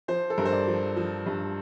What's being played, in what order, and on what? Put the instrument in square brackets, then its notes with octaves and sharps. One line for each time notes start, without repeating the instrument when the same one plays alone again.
[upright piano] F3 C5
A4
G2 A#4
C5
D5
F3
F3
G2